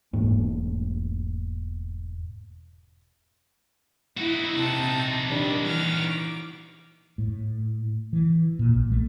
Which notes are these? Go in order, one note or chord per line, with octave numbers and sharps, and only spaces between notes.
E1 G#2 A3 A#3
D#4 E4 F#4
C3 A5
D#3 G3 D4
E3 F6
D6
A2
E3
A#2
B1
A3